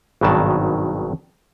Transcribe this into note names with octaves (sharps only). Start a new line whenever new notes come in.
G#1 G2 B2 D#3 F#3 A5